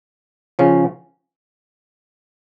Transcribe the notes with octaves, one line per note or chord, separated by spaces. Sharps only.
C#3 F3 C#4